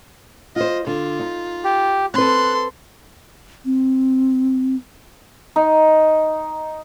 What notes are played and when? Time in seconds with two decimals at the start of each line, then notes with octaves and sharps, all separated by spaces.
0.56 F4 C5 D#5
0.87 D3 F4
1.20 D#4
1.64 G4
2.14 C4 A4 B4 C6 F#6
3.65 C4
5.56 D#4